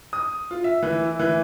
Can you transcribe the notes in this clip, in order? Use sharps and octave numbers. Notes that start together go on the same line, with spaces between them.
D#6
F4
E5
E3
E4
E3